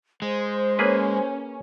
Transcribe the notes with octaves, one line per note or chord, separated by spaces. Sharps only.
G#3 C5
A#3 C#4 G#4 B4